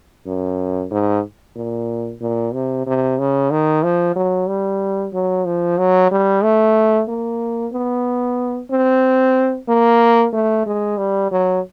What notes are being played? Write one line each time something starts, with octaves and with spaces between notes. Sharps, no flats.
F#2
G#2
A#2
A#2
C3
C3
C#3
D#3
F3
F#3
G3
F#3
F3
F#3
G3
A3
A#3
B3
C4
A#3
A3
G#3
G3
F#3